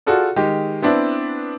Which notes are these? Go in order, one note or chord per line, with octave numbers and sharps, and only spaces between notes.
F4 F#4 G#4 A4 D5
D#3 G#3 G4
B3 C4 D4 E4